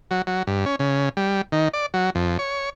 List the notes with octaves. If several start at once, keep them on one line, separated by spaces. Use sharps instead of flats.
F#3
F#3
G2
C#4
C#3
G3
D#3
D5
F#3
F2
C#5